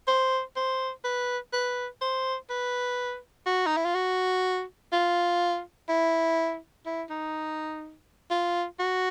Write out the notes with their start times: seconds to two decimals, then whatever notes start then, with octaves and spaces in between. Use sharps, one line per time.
0.08 C5
0.56 C5
1.04 B4
1.53 B4
2.01 C5
2.50 B4
3.46 F#4
3.66 D#4
3.77 E4
3.85 F4
3.95 F#4
4.93 F4
5.89 E4
6.86 E4
7.10 D#4
8.31 F4
8.79 F#4